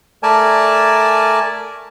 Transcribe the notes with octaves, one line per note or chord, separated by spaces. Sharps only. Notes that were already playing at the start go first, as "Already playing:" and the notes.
A3 A#4 D5 G#5 A5